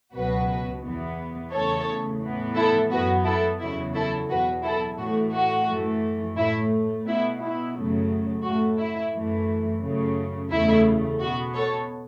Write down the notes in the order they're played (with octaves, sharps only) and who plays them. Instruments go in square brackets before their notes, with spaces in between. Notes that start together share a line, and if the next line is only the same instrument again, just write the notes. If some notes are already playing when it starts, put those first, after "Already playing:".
[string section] C#2 B2 F#3 F#4 B4
E2 E3 B3
E2 C#3 A3 A4 C#5
A2 E3 B3
E4 A4
F#2 F#3 B3 F#4 B4
E4 A4
E2 C#3 F#3 E4
E4 A4
E2 B2 F#3 F#4 B4
E4 A4
A2 E3 A3 F#4
F#4
F#2 E3 A3
A2 A3 E4
B2 B3 E4
E4
F#2 C#3 F#3 A3
A2 A3 F#4
E4
F#2 E3 A3
F#2 C#3 A3
E2 C#3 A3 E4
B2 B3 F#4
A4 C#5